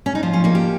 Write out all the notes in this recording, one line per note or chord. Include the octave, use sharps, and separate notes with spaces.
C#4
D#4
F3 F4
C#4
A#3 D#4
G4